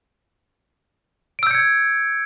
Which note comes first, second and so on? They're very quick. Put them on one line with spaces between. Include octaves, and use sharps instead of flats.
D7 E6 G6 C#7 G#6